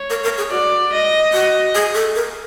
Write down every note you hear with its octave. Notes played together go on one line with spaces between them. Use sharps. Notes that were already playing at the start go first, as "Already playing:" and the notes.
Already playing: C#5
A#4
A#4
G#4
F#4 D5
D#5
F#4
G#4
A4
A#4